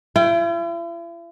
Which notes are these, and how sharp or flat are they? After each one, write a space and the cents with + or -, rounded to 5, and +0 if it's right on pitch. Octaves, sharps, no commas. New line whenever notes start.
E4 +45 G5 +0